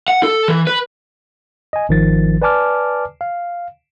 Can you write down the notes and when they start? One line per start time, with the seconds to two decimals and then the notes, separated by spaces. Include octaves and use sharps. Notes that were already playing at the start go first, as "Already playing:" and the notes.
0.08 F#5
0.23 A4
0.48 E3
0.67 B4
1.73 D#5 G#5
1.89 G#1 D#3 F3 A6
2.42 B4 D5 G#5 A5 D6 F6
3.21 F5